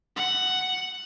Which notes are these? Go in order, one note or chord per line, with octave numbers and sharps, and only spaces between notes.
F#5